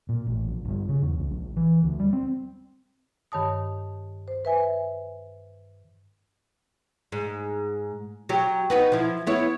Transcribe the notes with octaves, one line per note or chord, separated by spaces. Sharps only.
A#2
A1
A#1
G1
C#3
E2
C#2
A#1
E3
D2
G3
C4
G2 D#3 C#5 A5 D#6
C5
B4 E5 G#5
G#2
F#3 G4
D#4 F#4 B4
F3 E4
B3 E4 C#5